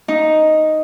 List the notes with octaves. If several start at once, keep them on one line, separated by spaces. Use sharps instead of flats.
D#4